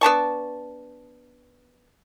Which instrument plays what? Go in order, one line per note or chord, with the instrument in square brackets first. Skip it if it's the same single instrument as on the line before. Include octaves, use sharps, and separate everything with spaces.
[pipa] B3 D4 A5 C#6